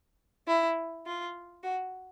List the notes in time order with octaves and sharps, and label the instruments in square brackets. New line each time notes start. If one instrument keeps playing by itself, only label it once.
[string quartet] E4
F4
F#4